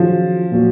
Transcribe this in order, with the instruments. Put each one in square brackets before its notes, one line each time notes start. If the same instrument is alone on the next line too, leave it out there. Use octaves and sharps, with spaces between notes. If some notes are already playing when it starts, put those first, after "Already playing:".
Already playing: [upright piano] D#3 F#3 C#4 F4 G#4 [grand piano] F3
[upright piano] A#2 F#3 A#3